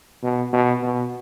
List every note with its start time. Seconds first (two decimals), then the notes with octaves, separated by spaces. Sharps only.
0.23 B2
0.53 B2
0.83 B2